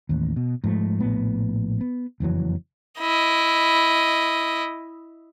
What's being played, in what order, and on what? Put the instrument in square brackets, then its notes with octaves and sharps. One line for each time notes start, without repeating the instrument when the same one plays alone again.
[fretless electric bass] A1 D#2
B2
G#2 F3 G3 A3
A#1 A2 B3
B3
F#1 F2 E3 F#3
[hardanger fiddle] E4 D#5